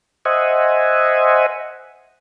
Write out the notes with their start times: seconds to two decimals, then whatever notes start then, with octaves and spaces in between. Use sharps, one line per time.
0.25 C5 D#5 E5 F#5 G#5